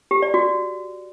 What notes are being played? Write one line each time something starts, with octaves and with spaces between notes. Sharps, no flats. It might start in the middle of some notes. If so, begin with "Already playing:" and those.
G4
D5
F#4